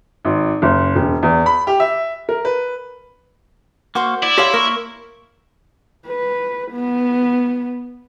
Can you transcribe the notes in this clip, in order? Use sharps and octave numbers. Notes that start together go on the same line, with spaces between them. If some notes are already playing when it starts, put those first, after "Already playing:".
G#1
F#1
E1
E2
B5
G4
E5
A#4
B4
A#3 F#4 C5 C#6
E4 D5
G4 C#5 E5 F5 C6 D#6
A#3 A#4 C#6
B4
B3